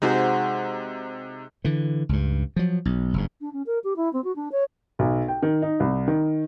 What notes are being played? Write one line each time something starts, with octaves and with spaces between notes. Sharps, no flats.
C3 G#3 D#4 F#4 C5
D3 E3
C#2 G2
F3 F#3
B1
F#1 G2
D4
C#4
A#4
G4
E4
C4
F#4
D4
C#5
B1
G5
D#3
D#4
C2
D#3